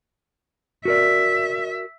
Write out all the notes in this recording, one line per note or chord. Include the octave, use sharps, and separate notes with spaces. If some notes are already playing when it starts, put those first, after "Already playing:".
F#4 A#4 D5 E5